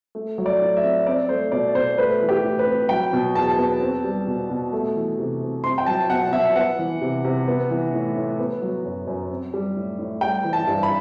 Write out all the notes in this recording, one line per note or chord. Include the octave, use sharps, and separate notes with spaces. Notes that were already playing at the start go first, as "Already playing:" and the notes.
A3
F#3
D5
A2
E5
C4
C4 D5
A3 C5
B2 D5
B2 C5
A3 B4
E3
G4
A2
B4
C4
F#3 G5
B2
E2 A5
B3
C4
G3
B2
B2
A3
E3
C3
C4
C4 C6
G5
F#3 A5
B2 F#5
B2 E5
B3 F#5
E3
C3
C3
B3
E3
A2
A2
B3
F#3
F#2
F#2
C4
G3
A2
A2
G3 G5
E3
A5
G2
B5